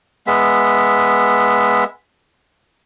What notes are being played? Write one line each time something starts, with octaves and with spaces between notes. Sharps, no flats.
G#3 B3 E5